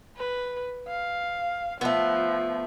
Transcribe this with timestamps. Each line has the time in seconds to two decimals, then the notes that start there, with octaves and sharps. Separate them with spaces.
0.17 B4
0.88 F5
1.81 F3 A3 B3